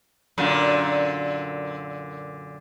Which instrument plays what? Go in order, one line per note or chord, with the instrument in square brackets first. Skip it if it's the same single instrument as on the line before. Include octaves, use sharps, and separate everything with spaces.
[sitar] F#2 A#2 D3